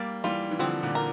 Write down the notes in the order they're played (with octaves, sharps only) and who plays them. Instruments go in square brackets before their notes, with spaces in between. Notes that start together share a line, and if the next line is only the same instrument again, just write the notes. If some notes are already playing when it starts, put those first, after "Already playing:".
Already playing: [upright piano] G3 A#3 [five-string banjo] D5
[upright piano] E3 G3 [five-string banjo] F4
[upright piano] E3
[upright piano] D3 F3 [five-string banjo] C4
[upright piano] A#2 D3
[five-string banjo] A#4